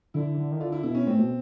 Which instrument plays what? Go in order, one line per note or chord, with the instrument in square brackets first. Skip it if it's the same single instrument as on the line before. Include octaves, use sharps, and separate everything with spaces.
[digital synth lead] D3 [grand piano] E4
[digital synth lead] D3
D#3
[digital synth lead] D3 [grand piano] F4
[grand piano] E4
[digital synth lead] B2 [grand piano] E4
[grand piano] C#4
[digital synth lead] A2 [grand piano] C4
[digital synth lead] B2